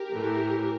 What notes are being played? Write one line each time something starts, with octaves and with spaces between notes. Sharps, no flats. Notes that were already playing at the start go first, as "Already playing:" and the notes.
Already playing: G4 A#4
A2 E3 A3